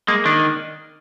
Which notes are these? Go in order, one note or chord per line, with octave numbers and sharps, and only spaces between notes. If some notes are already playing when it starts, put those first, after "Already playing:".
G#3 A#3
D#3 D4